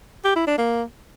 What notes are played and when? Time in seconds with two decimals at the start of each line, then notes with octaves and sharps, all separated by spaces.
0.24 G4
0.36 E4
0.47 D4
0.58 A#3